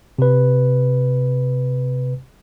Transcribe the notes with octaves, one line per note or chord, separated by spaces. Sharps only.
C3 B4